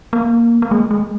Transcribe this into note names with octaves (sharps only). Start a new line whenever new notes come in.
A#3
A#3
G#3
G#3